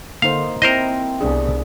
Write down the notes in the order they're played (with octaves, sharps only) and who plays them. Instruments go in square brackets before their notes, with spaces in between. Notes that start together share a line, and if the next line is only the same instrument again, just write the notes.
[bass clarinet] D3 [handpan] A#3 D#4 C5 [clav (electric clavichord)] F5
[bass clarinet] C4 [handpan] E4 [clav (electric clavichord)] A#4 C5 D#5
[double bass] C2 B3 [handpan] D4 G#4